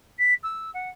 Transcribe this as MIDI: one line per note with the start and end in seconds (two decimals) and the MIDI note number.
0.19 0.34 95
0.43 0.70 88
0.74 0.89 78